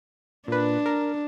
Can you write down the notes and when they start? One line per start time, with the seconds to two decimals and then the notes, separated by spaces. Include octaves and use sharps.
0.48 A#2 D4 B4
0.86 A#4